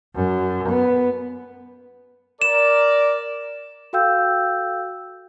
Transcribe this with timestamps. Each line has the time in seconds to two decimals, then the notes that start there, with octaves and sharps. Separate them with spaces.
0.15 F#2
0.68 B3
2.42 A#4 D5 E7
3.93 F#4 A4 F5 G5 E6 G6